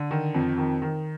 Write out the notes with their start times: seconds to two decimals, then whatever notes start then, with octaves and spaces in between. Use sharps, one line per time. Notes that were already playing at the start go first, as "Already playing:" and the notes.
Already playing: D3
0.11 D#3
0.35 F2
0.58 D#3
0.82 D#3